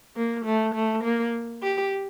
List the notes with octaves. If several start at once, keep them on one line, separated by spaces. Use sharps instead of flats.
A#3
A3
A3
A#3
G4